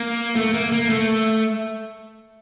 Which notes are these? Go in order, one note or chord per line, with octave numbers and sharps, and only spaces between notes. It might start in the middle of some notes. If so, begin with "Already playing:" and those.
Already playing: A#3
A3
A#3
A#3
A3